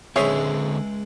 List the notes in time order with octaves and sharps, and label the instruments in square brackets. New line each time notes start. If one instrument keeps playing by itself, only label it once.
[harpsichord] C#2 G#3 C6 [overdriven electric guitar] D3 C4 [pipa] G#4 C#5 E5